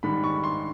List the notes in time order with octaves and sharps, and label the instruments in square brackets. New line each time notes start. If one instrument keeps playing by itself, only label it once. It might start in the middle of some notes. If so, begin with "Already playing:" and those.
[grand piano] G#2 D#3 G3 B5
C#6
C6